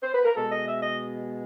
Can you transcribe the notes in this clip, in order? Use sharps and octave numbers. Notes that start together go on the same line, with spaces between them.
C5
B4
A#4
B2 G#3 A4
D#5
E5
D#5